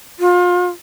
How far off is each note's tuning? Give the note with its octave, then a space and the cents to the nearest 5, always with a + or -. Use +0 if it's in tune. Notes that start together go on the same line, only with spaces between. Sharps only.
F4 +30